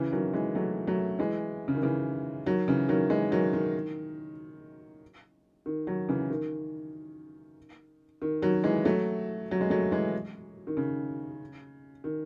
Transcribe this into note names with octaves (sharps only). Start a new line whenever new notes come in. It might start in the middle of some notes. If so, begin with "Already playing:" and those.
Already playing: C#3 E3
D#3 F#3
E3 G#3
F#3 A3
F#3 A3
E3 G#3
C#3
D#3
C#3 E3
D#3 F#3
C#3 E3
D#3 F#3
E3 G#3
D#3 F#3
D#3
D#3
D#3 F#3
C#3 E3
D#3
D#3
D#3 F#3
E3 G#3
F#3 A3
F#3
G#3
F#3 A3
E3 G#3
D#3
C#3
D#3